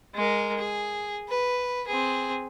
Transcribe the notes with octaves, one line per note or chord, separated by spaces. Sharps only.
G#3 A#4
G#4
B4
C4 G#4